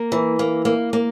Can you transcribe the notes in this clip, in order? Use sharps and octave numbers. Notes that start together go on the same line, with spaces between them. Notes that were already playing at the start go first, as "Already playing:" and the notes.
Already playing: A#3
E3
A#3
A#3
A#3